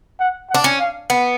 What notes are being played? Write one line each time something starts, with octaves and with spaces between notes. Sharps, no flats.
F#5
F#5
D4
C#4
F5
B3